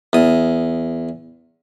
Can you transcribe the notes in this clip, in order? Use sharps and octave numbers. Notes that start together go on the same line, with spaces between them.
E2 D#6